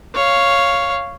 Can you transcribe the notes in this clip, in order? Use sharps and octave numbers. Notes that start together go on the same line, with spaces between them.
C#5 F5